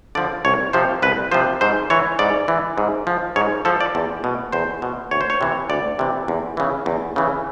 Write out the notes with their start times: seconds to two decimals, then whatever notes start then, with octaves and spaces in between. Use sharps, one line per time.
0.15 D3 F3 D5
0.45 C2 C#5
0.73 C3 F3 C5
1.02 C2 B4
1.31 C3 F3 C5
1.61 G#2 C5
1.90 E3 C#5
2.19 G#2 D5
2.48 E3
2.78 G#2
3.07 F3
3.36 G#2 C#5
3.65 F3 A4
3.80 D5
3.95 E2
4.24 B2
4.52 E2 C5
4.82 B2
5.11 D2 C#5
5.21 C5
5.30 C#5
5.41 C3 E3
5.70 D2 D5
5.99 C3 E3
6.28 E2
6.57 C#3 E3
6.86 E2
7.16 C#3 E3